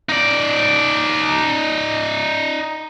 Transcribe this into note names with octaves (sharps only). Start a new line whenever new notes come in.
D#4 D5